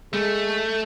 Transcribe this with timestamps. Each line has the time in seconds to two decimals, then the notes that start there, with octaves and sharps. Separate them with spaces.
0.13 G#3 A3